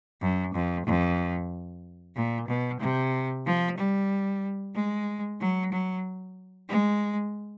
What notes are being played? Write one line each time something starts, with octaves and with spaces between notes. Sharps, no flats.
F#2
F2
F2
A#2
B2
C3
F3
G3
G#3
F#3
F#3
G#3